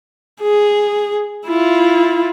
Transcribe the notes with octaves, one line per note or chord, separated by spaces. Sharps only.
G#4
E4 F4